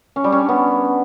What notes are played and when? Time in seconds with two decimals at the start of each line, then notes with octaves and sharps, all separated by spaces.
0.16 C#4
0.24 G3
0.32 C#4
0.40 D4
0.49 B3